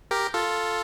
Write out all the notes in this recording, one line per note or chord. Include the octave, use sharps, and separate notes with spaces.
G4 A#4
F4 A4